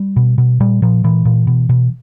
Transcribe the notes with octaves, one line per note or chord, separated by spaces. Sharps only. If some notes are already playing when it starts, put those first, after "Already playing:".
Already playing: G3
B2
B2
A#2 G3
A#2 F3
A#2 E3
A#2
B2
B2